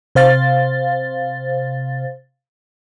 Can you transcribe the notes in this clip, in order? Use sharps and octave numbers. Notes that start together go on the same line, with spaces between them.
C3 C5 F5 A6